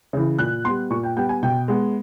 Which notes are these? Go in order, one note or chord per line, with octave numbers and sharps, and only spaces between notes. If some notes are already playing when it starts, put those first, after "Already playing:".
C#3 E3
A#2 F#6
G3 B3 C6
A#2 C#6
G5
G3 B3 G5
G#5
B2 G5
G#3 B3